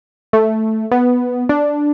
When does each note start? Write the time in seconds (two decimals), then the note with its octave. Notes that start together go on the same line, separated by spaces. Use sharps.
0.33 A3
0.91 B3
1.49 D4